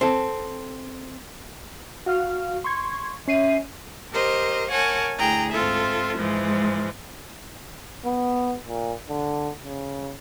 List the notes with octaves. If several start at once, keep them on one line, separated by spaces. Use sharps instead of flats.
C4 A4
F#4 F5 F6
C6 C#6 G#6
C#4 E5 C7 D#7
G4 A#4 C5 D#5
A#4 C#5 F#5 G#5 A5
D2 E4 G#4 G5 A#5
G#2 C4 F4 A4 E5
G#2 E3 F3 G#3
B3
A#2
D3
C#3